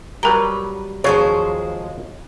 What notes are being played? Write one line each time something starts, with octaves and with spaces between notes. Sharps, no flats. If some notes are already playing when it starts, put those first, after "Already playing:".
F#3 G3 G4 A#4 B4 A#5
D#2 F3 F#3 G#3 G#4 C5 C#5